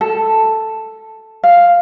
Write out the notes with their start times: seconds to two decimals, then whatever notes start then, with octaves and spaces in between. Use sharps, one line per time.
0.01 A4
1.44 F5